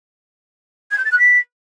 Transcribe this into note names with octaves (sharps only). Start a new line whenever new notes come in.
G#6
G6
A6
F#6
B6